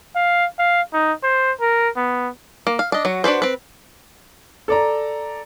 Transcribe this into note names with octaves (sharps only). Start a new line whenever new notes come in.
F5
F5
D#4
C5
A#4
B3
A#3
F5
D4 D#5
F#3 F#4
D4 F#4 B4 C5
C4 B4
A4 D5 A#5